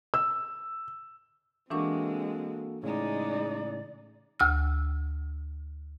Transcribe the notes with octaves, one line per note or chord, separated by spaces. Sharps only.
E6
E3 G#3 A#3 C4 D4 F#4 A4 C#6
A2 C#3 G#3 D#4 D5
D2 E6 F6